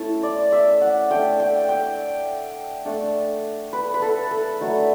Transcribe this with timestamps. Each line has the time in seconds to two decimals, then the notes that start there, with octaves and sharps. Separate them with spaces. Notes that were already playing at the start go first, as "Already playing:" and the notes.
Already playing: A3 C#4 E4 A5
0.23 D5
0.52 E5
0.81 F#5
1.11 A3 D4 G5
1.40 G5
1.69 G5
2.85 A3 D4
3.73 B4
3.94 B4
4.02 A4
4.31 A4
4.60 F#3 A3 D4